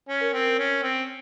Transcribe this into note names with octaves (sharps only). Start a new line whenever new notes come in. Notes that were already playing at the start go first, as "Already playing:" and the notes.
C#4
A#4
C4
C#4
C4